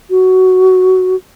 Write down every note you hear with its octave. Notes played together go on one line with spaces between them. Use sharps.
F#4